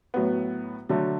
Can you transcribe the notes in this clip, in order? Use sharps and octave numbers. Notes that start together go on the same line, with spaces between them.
A2 F#3 B3
D3 F#3 A3